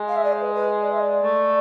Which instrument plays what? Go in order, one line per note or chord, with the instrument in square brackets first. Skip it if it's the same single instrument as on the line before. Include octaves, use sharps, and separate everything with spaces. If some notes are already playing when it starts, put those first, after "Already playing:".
Already playing: [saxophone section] G#3
[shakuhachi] F5
E5
D5
C5
B4
B4
D5
E5
D5
[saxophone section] A3